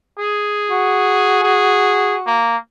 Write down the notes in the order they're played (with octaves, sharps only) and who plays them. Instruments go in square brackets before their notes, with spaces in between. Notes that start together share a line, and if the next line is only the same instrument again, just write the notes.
[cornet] G#4
[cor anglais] F#4
[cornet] G#4
A#3